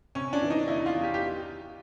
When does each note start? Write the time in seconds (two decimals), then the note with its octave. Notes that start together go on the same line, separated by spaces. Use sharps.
0.15 C3 C#4
0.33 D4
0.42 E3
0.50 D#4
0.68 E2 E4
0.86 F4
0.95 E2
1.03 G4
1.14 G4